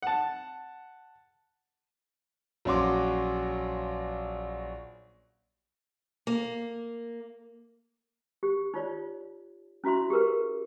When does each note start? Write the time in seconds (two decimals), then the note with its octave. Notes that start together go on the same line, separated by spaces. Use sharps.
0.02 F#5 A5
2.65 A#1 F#3 C#4 F#4 C6 D6
6.27 A#3
8.43 G4
8.74 D#4 F4 C#5 D5
9.84 C#4 E4 F#4 E5 C6
10.10 G4 G#4 A#4 B4